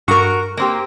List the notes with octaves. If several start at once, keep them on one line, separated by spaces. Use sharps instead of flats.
G2 F#4 A#4 C#6
A#3 C4 G4